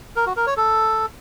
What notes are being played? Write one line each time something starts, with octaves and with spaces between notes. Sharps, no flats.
A#4
F#4
A#4
C#5
A4